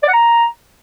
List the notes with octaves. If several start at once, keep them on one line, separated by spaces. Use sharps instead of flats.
D5
F#5
A#5